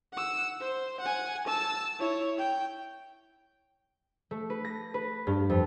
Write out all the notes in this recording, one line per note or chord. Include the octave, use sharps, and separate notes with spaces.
F#5 E6
C5
F#5 G#5
A5 E6
E4 C#5
G5
A3
B4
A#6
B4
G2
F2